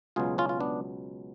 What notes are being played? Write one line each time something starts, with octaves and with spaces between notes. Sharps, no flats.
C#2 B2 F#3 F4 G#4
C#4 F4
F4
B3 D4